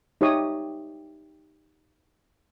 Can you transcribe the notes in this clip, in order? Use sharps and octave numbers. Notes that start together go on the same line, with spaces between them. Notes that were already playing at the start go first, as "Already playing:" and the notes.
D#4 G4 C#5 E5 D#6